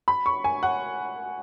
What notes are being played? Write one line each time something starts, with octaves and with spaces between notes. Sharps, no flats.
B5
C#6
G#5
F#5